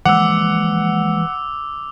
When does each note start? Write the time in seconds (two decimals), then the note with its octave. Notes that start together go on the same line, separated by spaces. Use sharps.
0.05 E3 F3 G#3 A#3 F#5 D6 E6